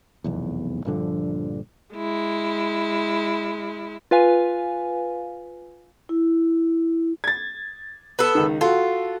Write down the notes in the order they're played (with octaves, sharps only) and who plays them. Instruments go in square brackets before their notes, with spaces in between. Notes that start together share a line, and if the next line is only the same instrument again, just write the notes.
[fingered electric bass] F1 B1 E2
A#1 G2 D3 F3
[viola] G#3 E4
[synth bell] F4 B4 F5 G#5
[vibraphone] E4
[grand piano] G#6 A6
[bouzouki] B3 A4
[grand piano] C#2 D#3
[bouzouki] F4 [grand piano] F#4 A4